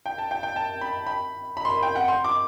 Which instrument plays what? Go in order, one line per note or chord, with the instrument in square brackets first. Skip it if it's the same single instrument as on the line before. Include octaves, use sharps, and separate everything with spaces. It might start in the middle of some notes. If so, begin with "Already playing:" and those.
[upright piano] G5
A5
G5
G5
A5
B5
B5
B5
C6
B5
G5
F#5
C6
D6